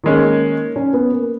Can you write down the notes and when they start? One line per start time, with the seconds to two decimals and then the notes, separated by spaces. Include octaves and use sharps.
0.04 D#3 G#3 A#3 C#4
0.76 C#4
0.93 B3
1.12 A#3